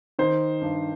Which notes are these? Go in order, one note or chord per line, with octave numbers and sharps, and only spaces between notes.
D#3 C5
G2